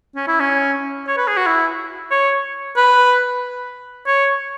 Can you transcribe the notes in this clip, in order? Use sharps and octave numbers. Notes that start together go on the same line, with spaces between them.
C#4
E4
C#4
C#5
B4
G#4
F#4
E4
C#5
B4
C#5